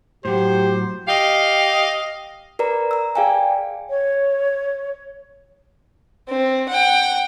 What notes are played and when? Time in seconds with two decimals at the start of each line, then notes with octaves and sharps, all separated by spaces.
0.25 A2 F#3 G4 C5
1.07 G4 D#5 F5
2.59 A#4 B4 D5 A#5
2.91 A#5 E6
3.15 G#4 D5 F5 G5 G#5
3.90 C#5
6.29 C4
6.69 F#5 G5